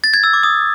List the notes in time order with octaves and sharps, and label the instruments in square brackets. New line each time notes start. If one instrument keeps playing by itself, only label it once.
[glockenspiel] A6
G#6
E6
D6
D#6